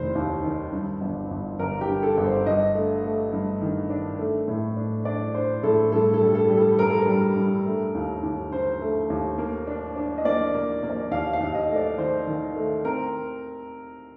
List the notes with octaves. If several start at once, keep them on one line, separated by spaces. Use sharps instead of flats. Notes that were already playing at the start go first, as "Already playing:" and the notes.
Already playing: F1 D#3 C5
D#2
D#3
G2
G1
G1
G1 A#4
G4
G2
A4
G1
C5
G2 D#5
A3
A3
G2
D#3
D4
A3
A2
D4
D4 D5
D4 C5
A2 A4
G2 A4
A4
G3
A4
G3
A4
G2 A#4
A4
A#4
G3
G2
A3
D#2
D#2
D3 C5
A3
D#2
A#3
D4
D4
D#5
A#3 D5
A#3
A#3
D5
D#2 F5
F5
D#2
D#5
A3
D5
D#3 C5
D#3
A3
C4 A#4